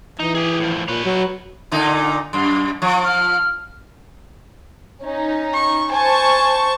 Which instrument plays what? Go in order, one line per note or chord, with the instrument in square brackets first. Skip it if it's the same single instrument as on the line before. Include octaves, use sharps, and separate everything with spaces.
[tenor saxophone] E3 [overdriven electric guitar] D#4
[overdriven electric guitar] G4 G#4
A2 F3
[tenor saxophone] A#2 [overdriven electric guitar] B4 C#5
[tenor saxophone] F#3
[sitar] A#2 D3 D#4
[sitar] F#2 [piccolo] C6
[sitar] F3 [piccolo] C#6
[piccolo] F6
[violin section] C#4 D#4
[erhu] C#6
[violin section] C5 A5 C#6 [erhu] G#5